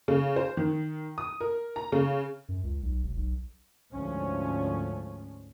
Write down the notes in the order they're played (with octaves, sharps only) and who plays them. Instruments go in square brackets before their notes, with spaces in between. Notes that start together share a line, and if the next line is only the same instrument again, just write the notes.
[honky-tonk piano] C#3
C5
D#3
D#6
A#4
A#5
C#3
[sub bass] F#2
C#2
B1
E1
B1
[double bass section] D2 G#2 F3 G#3 C#4